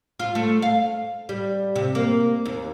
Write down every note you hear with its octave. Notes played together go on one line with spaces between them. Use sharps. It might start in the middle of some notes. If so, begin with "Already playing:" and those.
F4
A3
F5
G3
C3
A#3
D#2